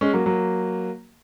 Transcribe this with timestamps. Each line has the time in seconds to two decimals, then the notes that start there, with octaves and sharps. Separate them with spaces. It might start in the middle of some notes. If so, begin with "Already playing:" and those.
0.01 G#3 C#4
0.13 F#3 A#3
0.26 F#3 A#3